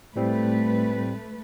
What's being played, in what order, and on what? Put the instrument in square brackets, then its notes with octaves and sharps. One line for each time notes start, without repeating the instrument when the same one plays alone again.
[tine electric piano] A2 G3 C4 [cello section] A3 B4